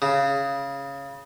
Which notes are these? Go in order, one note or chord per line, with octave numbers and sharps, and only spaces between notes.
C#3